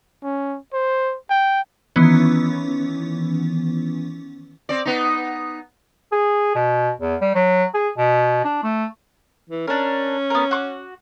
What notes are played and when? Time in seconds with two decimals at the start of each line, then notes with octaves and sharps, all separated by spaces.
0.23 C#4
0.73 C5
1.30 G5
1.96 D#3 E3 B3 C#4
4.69 C4 D5
4.85 B3 D#4
6.12 G#4
6.55 B2
7.00 E2
7.21 G3
7.35 F#3
7.74 G#4
7.98 B2
8.45 D4
8.63 A3
9.49 E3
9.67 C#4 D4 A#4
10.30 B3 A#4
10.51 F#4 C#6 D6